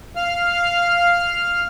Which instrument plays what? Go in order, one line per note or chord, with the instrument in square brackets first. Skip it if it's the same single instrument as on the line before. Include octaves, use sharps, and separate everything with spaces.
[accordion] F5 F6